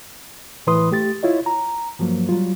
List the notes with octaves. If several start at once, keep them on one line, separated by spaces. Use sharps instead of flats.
A2 E3 E4 B4 C6 D#6
A3 G4 A6
E4 F4 C#5 D#5
A#5
G2 F3 F#3 A#3
F#3 G3 F4